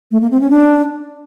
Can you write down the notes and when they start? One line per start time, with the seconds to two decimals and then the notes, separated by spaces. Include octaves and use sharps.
0.11 A3
0.21 A#3
0.31 C4
0.41 C#4
0.50 D4